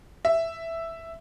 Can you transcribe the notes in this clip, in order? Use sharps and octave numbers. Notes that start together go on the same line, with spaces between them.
E5